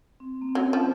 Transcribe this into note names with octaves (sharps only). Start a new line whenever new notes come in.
C4
A#3
C4
F#3 C#4
F3